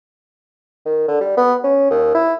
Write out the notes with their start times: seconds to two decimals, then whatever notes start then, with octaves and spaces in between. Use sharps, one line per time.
0.86 D#3
1.08 D3
1.21 G3
1.37 B3
1.64 C#4
1.91 D#2
2.15 E4